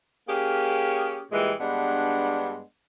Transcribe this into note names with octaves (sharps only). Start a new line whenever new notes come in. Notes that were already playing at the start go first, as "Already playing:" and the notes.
A#3 C#4 G4 G#4
A#2 E3 G3 G#3
G2 G#3 B3 D4